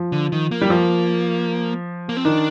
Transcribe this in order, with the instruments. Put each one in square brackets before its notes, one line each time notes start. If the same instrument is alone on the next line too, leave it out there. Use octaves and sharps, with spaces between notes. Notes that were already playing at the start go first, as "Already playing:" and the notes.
Already playing: [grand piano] F3
[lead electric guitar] D3
D#3
A#3
[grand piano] G3
F3
[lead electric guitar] A#3
C4
[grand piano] D#3 [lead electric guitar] D4